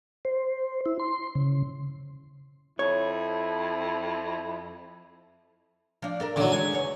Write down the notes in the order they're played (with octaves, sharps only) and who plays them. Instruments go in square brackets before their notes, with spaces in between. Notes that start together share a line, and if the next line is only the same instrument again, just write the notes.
[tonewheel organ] C5
E4
C6
C#3
[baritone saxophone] F2 [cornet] E4 [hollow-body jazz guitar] C#5
[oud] F3 D4
D4 A4 A#4
[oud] A#2 D#3 E4 [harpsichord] D3 F#3
[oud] G#3 A3 [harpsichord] G#5
[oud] E2 C#3 C#5